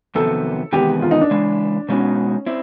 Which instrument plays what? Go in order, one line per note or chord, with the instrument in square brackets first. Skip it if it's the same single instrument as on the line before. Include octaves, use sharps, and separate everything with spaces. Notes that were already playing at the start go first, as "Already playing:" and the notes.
[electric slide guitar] F2 C3 D#3 F#3 B3 [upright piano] A4
[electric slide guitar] E2 C3 D#3 G#3 B3 [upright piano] G4
[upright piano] F4
D#4
D4
[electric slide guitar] C#3 E3 G#3
[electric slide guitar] B2 G#3 B3 D#4 F#4 [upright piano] C#4
[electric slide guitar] C4 E4